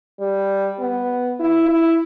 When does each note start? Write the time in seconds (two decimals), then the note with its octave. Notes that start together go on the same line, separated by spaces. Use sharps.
0.20 G3
0.80 B3
1.40 E4
1.68 E4